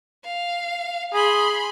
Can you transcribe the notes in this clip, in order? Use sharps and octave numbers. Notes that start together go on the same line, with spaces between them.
F5
G#4 B5 C6